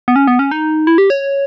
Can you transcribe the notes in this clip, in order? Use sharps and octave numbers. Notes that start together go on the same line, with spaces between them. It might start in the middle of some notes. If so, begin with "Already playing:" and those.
B3
C#4
B3
C#4
D#4
E4
G4
C#5